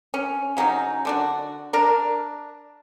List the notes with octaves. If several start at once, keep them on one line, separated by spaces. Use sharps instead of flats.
C#4
C#3 F#3 C#4 D#4
D3 D4 F#4
D4 A#4 A#5